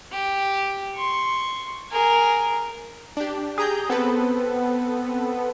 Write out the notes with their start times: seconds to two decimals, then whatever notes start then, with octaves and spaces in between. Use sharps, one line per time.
0.12 G4
0.96 C6 C#6
1.91 G#4 A#4
3.17 D4 G4
3.58 G4 G#4 A#5 G6
3.90 B3 C4 A4 B4